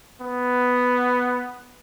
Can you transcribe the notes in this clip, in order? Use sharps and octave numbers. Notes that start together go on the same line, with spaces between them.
B3